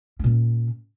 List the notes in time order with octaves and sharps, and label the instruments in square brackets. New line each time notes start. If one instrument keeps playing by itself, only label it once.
[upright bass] A#2 C#4